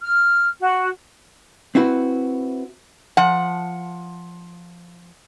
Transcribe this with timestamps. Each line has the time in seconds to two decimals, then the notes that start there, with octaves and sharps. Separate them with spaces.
0.01 F6
0.61 F#4
1.75 C4 E4 F#4 B4
3.17 F3 F#5